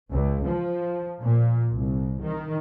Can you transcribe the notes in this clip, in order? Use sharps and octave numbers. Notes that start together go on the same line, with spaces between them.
C#2
F3
A#2
C2
D#3